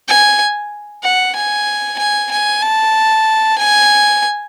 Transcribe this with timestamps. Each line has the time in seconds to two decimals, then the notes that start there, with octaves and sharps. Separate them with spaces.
0.08 G#5
1.03 F#5
1.36 G#5
1.98 G#5
2.31 G#5
2.63 A5
3.58 G#5